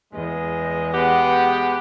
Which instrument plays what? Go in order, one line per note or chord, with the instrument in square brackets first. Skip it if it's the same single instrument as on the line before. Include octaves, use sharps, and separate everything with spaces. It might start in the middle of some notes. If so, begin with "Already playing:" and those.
[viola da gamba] E2 D#5 [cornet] G#3
[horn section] G#3 B3 G4 [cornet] F#5